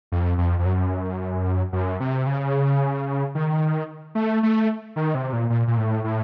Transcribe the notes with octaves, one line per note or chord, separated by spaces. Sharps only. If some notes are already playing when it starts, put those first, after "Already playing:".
F2
F2
F2
F#2
F#2
C3
C#3
D#3
A3
A3
D#3
C3
A#2
A#2
A#2
A2
A2